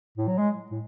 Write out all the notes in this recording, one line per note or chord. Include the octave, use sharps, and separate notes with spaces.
A2
F#3
G#3
A2